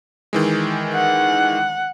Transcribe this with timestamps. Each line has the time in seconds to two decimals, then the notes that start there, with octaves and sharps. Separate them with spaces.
0.33 D#3 E3 G#3
0.94 F#5